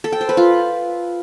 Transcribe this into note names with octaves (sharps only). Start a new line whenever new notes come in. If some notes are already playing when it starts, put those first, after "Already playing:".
A4
G5
C5
B4
F4